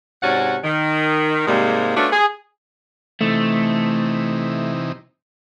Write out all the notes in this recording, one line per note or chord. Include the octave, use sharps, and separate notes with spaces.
G#2 C3 C#4 F#4 D5 F#5
D#3
G#2 C3 G3 G#3 A#3
A3 B3 C#4 D4 F4 F#4
G#4
C3 E3 A3 D#4